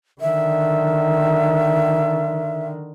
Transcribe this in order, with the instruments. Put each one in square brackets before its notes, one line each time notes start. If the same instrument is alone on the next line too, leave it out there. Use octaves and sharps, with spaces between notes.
[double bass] D3 D#3 [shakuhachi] E5